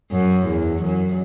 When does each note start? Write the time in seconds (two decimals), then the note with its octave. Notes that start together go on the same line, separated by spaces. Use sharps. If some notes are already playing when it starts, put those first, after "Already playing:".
0.12 F#2
0.47 E2
0.82 F#2